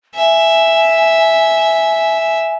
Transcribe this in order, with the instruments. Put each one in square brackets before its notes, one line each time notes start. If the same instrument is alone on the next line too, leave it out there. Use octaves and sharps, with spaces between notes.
[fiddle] E5 [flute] G#5